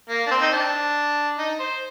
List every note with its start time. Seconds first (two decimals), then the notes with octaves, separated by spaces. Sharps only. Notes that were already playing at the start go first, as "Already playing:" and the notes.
0.09 A#3
0.27 D4
0.31 C4
0.42 D#4
0.52 D4
1.38 D#4
1.59 C5